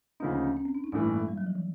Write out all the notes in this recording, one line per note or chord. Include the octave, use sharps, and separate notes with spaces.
D2 C#3 F3 A#3 D4 D#4
C#4
C#4
C#4
C4
D4
D#4
A1 G2 E3 A3 D4
A#3
G#3
G3
F#3
F3
E3